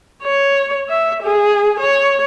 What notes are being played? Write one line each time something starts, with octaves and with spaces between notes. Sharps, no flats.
C#5
E5
G#4
C#5